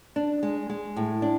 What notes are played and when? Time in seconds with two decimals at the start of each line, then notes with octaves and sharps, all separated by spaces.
0.16 D4
0.43 G#3
0.69 G#3
0.96 A2
1.22 D4